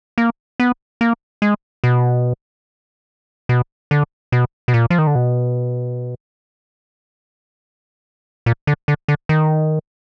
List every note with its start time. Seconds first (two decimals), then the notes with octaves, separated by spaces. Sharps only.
0.18 A#3
0.60 B3
1.01 A#3
1.42 G#3
1.84 B2
3.49 B2
3.91 D3
4.32 B2
4.68 B2
4.74 A#2
4.90 F3
4.98 D#3
5.07 D3
5.15 B2
8.46 A#2
8.67 D3
8.88 D3
9.08 D3
9.29 D#3